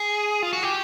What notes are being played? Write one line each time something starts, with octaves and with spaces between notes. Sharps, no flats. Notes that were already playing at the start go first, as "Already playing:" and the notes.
Already playing: G#4
F4
F#4
G4